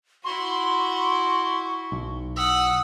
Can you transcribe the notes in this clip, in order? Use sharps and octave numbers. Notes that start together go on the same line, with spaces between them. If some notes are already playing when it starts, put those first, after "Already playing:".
E4 F#4 C6 C#6
B1
F#5 D#6 E6